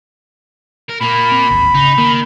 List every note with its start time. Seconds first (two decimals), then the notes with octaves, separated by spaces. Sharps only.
0.89 A#4
1.01 A#2 A#3 B5
1.32 C4
1.50 D1 G#1
1.75 C#3 D#4
1.98 D#3 A#3